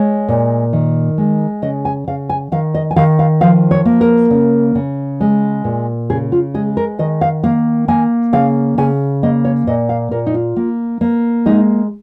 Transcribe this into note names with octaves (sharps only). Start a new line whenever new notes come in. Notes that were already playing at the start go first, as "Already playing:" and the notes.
Already playing: G#3 C#5
A#2
D#3
G#3
C#3 D#5
G#5
C#3 F5
G#5
D#3 F5
D#5
G#5
D#3 F5
F5
F3 F5
C#5
A#3
A#4
C#3
C#3
G#3
A#2
C#3 G#4
F4
G#3 G#4
A#4
D#3 D#5
F5
A#3 F5
A#3 G#5
C#3 F5
C#3 G#5
A#3 D#5
C#5
A#2 D#5
F5
A#2 A#4
D#4
F4
A#3
A#3
G#3 D#4